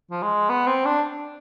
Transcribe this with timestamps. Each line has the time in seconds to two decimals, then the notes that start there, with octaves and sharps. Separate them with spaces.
0.11 F3
0.22 G#3
0.49 B3
0.67 C4
0.85 D4